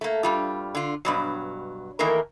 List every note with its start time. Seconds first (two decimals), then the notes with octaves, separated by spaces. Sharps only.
0.01 A3 A#3
0.23 G2 G3 F4
0.75 D3 F4
1.05 G2 B2 F#3
1.99 D#3 E3 A3 A#3 A#4